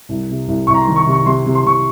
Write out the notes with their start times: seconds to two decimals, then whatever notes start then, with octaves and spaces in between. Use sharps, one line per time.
0.09 C2
0.29 C3
0.48 C2
0.67 C2 C#6
0.74 A#5
0.82 C6
0.87 D#3
0.96 C#6
1.06 C3
1.11 C#6
1.25 C3 C6
1.45 C3
1.55 C6
1.64 C3 C#6